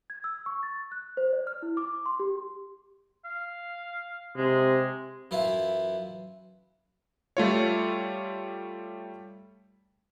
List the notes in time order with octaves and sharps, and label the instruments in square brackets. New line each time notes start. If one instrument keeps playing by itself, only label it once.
[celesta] G#6
E6
C#6
A6
F#6
C5
D5
F6
E4
D6
C6
G4
[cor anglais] F5
[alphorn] C3 [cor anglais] G#3
[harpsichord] F#2 E3 E4 F4 F5
[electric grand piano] G3 A3 F4 C#5